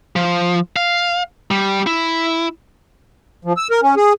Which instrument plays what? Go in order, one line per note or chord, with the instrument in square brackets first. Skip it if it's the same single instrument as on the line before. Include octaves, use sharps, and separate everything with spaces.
[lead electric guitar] F3
F5
G3
E4
[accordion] F3
E6
A#4
C#4
G#4